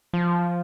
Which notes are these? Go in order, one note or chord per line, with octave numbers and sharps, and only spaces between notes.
F3